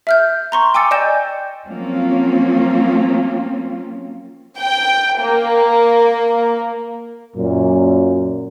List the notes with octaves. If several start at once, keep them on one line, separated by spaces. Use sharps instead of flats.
E5 F6 G6
A#5 C6 C#6
G5 G#5 D6 E6 A6 C#7
D5 D#5 G5 G#5 G6 E7
F3 F#3 A#3 C4 C#4 F4
G5
A#3
F#2 A#2